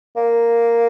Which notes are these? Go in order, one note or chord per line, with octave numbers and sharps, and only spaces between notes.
A#3